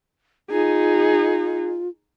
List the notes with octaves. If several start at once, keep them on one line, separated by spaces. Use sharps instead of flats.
D#4 F4 G#4